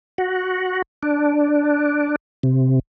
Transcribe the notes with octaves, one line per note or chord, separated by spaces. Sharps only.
F#4
D4
C3